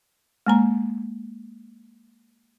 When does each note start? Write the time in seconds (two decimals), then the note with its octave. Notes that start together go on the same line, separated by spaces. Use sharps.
0.46 G#3 A#3 A#5